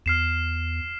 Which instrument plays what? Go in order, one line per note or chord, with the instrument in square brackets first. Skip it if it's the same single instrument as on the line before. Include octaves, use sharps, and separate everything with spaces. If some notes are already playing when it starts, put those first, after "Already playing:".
[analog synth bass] E2 [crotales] F6 C7 E7